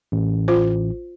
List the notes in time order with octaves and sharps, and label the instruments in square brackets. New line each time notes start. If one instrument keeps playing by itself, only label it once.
[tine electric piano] A1
[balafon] F4 C5